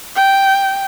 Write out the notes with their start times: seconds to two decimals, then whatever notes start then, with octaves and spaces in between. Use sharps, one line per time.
0.16 G5